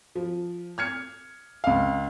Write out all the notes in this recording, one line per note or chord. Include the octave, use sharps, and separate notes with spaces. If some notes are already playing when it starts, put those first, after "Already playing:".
F3
F6 G#6 C#7
C#2 F5